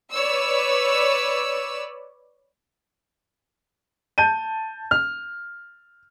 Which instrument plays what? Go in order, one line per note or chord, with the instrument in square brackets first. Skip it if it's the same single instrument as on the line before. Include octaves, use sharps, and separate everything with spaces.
[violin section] B4 C#5 D5 E6
[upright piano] A5 G6 D#7
F6